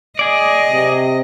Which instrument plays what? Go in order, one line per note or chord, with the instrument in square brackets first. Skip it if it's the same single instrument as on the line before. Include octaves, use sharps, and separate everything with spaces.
[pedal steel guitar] G#4 D5 [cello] D#5
[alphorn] C3